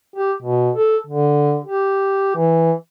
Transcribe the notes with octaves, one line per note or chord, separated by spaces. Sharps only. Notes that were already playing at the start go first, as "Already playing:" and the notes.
G4
B2
A4
D3
G4
E3